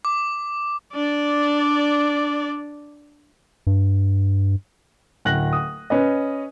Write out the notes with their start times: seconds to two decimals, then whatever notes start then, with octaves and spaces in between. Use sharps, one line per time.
0.05 D6
0.94 D4 D5
3.67 G2
5.25 D1 F#6 A#6 F#7
5.53 D#6
5.90 C#4 B4 D#5